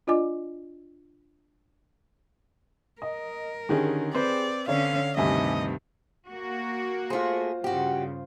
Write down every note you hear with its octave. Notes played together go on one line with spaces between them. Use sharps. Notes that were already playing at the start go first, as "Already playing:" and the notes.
D4 F4 D5 D#5 G#5 D6
A#4 D#5
D3 D#3 C#4 G4 G#4
C4 B4 C5 D5
D3 C#4 C#5 D5 F5
D2 G2 C3 D#3 G4 D#5 E5 G#5
A#3 F#4
A3 F4 G#4 C5
G2 C#3 F#4 G4